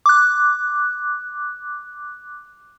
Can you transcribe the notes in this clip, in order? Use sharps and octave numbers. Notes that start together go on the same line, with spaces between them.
D6 F#6